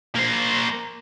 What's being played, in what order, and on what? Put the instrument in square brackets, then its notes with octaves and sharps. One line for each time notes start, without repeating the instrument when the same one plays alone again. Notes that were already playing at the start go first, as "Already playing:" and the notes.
[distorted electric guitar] A#3 C5